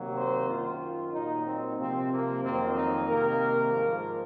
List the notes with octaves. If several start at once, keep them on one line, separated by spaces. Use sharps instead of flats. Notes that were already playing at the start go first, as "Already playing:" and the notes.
Already playing: C3 D#3 F#3 A#3
C5
F#2 D#3 F#3 F4
A#2 F#3 A#3 D#4
C4
C3 F3 A#3 C4
A#3
F2 D#3 F#3 A#3 C4
D#4
C3 D#3 A#3 A#4
G#2 F3 A#3